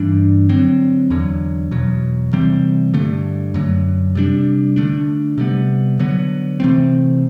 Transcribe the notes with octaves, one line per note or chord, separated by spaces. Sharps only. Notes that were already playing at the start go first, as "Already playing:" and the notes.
Already playing: G2 E3 G3 D4
D3 F#3 C4
E2 D3 F#3
E2 B2 F#3
C3 E3 G3 C4
G2 D3 A3
F#2 D3 F#3
C3 G3 D4
D3 A3 D4
C3 G3 B3
D3 F#3 B3
C3 E3 A3 C4